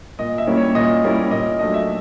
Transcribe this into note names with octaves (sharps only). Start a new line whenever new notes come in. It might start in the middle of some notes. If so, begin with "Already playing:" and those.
A#2 D#5
E5
G3 A#3 C#4 E4
C#5
A#2 D#5
G3 A#3 C#4 E4
A#2 D#5
F#3 A3 D4 D#5
E5